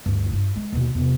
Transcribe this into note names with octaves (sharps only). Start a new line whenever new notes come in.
D2 G2
G2 F4
G#3
D#2 B2
E2 C3